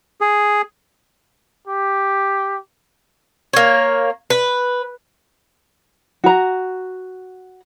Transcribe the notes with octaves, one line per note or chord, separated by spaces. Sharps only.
G#4
G4
A#3 C#5
B4
F#4 A#5